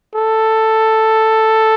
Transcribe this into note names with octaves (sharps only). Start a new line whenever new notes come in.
A4